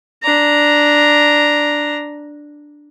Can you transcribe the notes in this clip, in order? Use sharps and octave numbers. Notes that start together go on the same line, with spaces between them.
D4 A#5